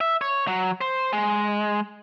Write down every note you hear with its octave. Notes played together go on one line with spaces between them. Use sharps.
E5
C#5
F#3
C5
G#3